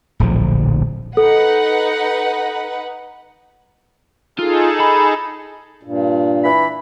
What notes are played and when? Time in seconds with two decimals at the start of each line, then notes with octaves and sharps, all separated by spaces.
0.20 D1 A#1 D3 F3
1.17 D#4 A4 B4 F#5
4.39 D#4 F4 G#4 A4
4.80 B5
5.83 G2 A#2
6.44 E3 B5